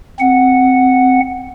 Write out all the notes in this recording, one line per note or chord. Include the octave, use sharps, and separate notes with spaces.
C4 F#5